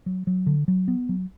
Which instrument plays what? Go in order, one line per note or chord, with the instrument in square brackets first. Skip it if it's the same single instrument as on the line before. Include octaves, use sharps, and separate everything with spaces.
[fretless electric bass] F#3
F#3
D3
F#3
B3
F#3